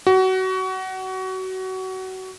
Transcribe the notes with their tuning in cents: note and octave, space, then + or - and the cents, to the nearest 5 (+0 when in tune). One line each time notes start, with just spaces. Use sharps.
F#4 +25